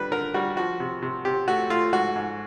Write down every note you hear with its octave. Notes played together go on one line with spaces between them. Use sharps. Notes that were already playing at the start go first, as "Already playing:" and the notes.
Already playing: D3 G3 B4
D3 A#4
G3 F#4
F3 F#4
C3
C3
C3 G4
A3 F#4
A3 F4
G#2 F#4
G#2